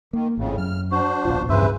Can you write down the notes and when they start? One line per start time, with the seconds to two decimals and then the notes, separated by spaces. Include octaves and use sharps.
0.13 D#3 A#3
0.37 G#1 F2 A2 C#3
0.58 F#2 F6
0.91 D4 F#4 C5
1.25 D1 A#1 B2 F4
1.49 G2 C#3 E3 B4 C5 E5